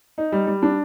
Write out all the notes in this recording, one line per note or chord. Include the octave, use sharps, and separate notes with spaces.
D#4
G3
G3
D4